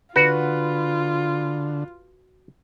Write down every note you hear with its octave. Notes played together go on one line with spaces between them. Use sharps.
D3 F4 F#4 B4